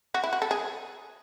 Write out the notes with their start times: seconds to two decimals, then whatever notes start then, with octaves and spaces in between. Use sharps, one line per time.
0.14 F#4
0.24 E4
0.33 F#4
0.42 A4
0.51 G#4